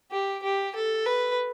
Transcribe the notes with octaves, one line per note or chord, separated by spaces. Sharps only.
G4
G4
A4
B4